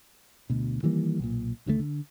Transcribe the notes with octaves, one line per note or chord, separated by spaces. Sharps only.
D2 B2
D#3 E3 G3 A#3
B1 A#2
C#2 D3 F3 A3
D3